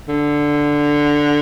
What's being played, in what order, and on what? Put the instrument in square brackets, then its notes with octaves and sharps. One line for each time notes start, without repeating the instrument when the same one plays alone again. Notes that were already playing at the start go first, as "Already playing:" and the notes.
[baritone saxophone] D3